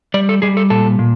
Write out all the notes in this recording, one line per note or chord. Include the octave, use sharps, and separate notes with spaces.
G3 D5
A4
G3 G#4
A4
A#2 A4
A#2